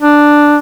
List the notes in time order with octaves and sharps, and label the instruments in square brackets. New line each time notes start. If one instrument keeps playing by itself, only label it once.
[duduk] D4